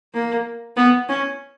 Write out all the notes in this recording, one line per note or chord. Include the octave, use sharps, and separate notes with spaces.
A#3
B3
C#4